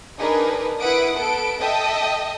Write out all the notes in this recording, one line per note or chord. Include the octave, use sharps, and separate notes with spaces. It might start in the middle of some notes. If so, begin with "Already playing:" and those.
D4 D#4 G#4 A#4 B4
E4 B4 F#5 D#6 D7
B3 A4 D7
A4 D#5 E5 G5 A5 D#6